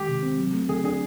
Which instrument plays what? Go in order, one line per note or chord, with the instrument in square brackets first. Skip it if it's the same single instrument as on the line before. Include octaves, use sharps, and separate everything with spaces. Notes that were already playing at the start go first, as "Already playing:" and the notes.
Already playing: [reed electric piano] D#3 G#3 [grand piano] G4
[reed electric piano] C3
C4
F#3
A3
[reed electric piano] D3 [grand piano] G#4
[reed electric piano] D4 [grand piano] G#4